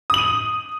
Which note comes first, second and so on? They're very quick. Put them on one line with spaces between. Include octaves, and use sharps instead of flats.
D#6 F#7 D#7